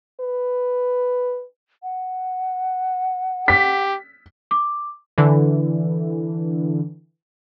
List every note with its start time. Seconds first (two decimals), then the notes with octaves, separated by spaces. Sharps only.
0.21 B4
1.83 F#5
3.48 G4 B6
4.51 D6
5.18 D3 E3